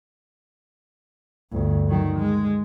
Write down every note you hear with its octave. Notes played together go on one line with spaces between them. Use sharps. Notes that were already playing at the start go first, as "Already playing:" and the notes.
G1 D2
D#3 F#3
G#3